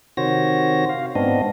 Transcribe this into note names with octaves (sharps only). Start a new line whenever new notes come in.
C3 D#3 F#4 C5 C#5 A#6
F5
G#2 B3 C4 D4 D#5